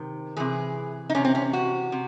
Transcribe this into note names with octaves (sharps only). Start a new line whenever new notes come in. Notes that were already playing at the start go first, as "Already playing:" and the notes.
Already playing: C3 D#3
C3 E3 G#4
D#4
C3 E3 C#4
C4
C#4
F#4
C3